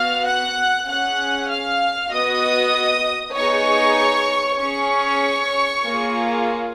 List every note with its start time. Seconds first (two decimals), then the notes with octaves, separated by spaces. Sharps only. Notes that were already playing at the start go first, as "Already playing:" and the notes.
Already playing: B3 F#4 F5 F6
0.25 F#5 F#6
0.88 C#4 G#4 F#5 F#6
1.49 F5 F6
2.11 B3 F#4 D#5 D#6
3.35 B3 D#4 G#4 C#5 C#6
4.59 C#4 G#4 C#5 C#6
5.84 A#3 F4 G#4